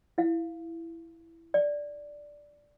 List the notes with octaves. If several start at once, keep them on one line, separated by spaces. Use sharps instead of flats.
E4 F5
D5